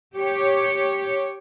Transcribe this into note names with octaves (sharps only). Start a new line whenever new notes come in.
G4 C#5